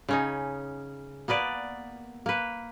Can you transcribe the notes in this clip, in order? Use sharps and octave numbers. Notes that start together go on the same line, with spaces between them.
C#3 C#4 D#4
A#3 B3 B4 D5
A#3 B4